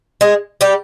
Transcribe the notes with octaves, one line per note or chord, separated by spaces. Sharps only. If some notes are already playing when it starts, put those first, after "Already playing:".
G#3 G#4
G3 G4